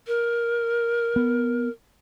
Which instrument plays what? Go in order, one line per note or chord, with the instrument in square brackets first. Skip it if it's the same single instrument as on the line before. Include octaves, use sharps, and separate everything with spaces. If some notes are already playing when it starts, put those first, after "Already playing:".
[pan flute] A#4
[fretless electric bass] B3